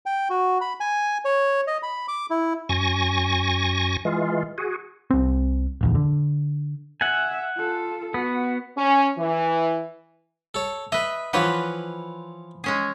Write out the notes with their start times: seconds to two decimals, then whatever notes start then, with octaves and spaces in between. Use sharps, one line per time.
0.06 G5
0.30 F#4
0.61 B5
0.80 G#5
1.25 C#5
1.67 D#5
1.83 B5
2.08 D6
2.30 E4
2.69 F#2 G#5 C#6 A#6
4.05 E3 G#3 F4
4.58 F#4 G#4
5.10 C2 C4
5.81 D1 A#1 E2
5.95 D3
7.01 E5 F#5 G#5
7.56 F4 A4
8.14 B3 F#4
8.77 C#4
9.18 E3
10.54 A4 C#5
10.92 B4 D#5 E5
11.33 E3 F3 F4 B4 C#5 F#5
12.64 G#3 C#4 G#4